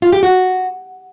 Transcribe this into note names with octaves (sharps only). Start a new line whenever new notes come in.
F4
G4
F#4